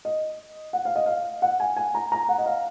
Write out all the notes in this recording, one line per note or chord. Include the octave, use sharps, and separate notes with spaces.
D#5
F#5
F5
D#5
F5
F#5
G#5
G#5
A#5
A#5
F#5
D#5
F5